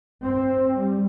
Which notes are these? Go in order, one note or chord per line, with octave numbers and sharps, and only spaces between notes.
C4
G3